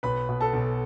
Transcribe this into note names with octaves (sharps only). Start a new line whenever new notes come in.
B1 B4 B5
B2
A4 A5
B1